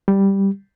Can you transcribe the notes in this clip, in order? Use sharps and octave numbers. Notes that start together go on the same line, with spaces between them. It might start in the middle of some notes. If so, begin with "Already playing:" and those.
G3